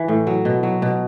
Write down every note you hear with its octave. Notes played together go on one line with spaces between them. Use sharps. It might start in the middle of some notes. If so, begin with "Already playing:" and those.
Already playing: E3
A2
F#3
B2
F#3
B2